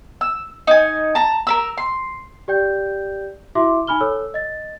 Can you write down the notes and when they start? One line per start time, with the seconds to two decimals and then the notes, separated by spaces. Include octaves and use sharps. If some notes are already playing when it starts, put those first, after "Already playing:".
0.21 E6
0.67 D#4 G#5
1.15 A5 A#5
1.47 A#4 B4 E6
1.77 C6
2.48 G4 D5 G5 G6
3.55 E4 F#4 E5 C6 D6
3.87 D#4 G#5 B5 F6 G7
4.01 A4 C#5 E6
4.34 D#5 A6